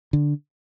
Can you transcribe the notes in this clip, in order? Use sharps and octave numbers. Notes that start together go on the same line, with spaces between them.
D3